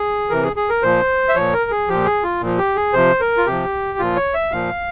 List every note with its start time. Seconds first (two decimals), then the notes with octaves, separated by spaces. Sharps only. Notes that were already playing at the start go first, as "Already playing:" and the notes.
Already playing: G#4
0.30 C3 E3 A#4
0.43 G#4
0.56 G#4
0.70 A#4
0.83 A#2 F3 C5
1.29 E5
1.35 A#2 F3 C#5
1.53 A#4
1.71 G#4
1.88 A#2 F3 G4
2.05 G#4
2.23 F4
2.41 A#2 F3
2.58 G4
2.76 G#4
2.93 C3 F3 C5
3.20 A#4
3.37 F4
3.46 C3 F3 G4
3.99 A#2 F3 F4
4.16 C#5
4.34 E5
4.51 A#2 F3 F5